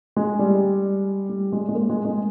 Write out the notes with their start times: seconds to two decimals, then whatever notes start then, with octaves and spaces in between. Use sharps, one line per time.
0.17 G#3
0.39 G3
1.29 G3
1.52 G#3
1.69 G#3
1.75 A#3
1.90 G#3
2.05 G#3